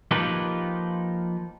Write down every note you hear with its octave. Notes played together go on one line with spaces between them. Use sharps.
F3 A#3 D#4 F4 G4 B4